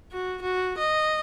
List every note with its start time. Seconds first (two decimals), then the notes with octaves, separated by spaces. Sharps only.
0.12 F#4
0.42 F#4
0.78 D#5